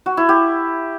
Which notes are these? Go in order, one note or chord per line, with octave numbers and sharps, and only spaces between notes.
F#4
E4
G4